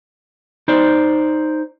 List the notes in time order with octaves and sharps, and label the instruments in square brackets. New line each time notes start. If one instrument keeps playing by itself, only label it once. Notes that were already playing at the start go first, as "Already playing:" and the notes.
[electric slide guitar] D#4 C5 D5